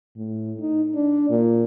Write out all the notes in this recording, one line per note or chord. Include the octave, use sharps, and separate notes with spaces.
A2
D#4
D4
A#2